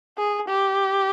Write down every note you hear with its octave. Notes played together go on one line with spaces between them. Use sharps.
G#4
G4